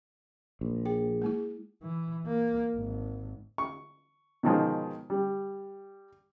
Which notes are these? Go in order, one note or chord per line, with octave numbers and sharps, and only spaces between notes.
A#1
G#4 G5
G#3 A#3 E4
E3
A#3
G#1
C#6
B2 D#3 F3 G#3
G3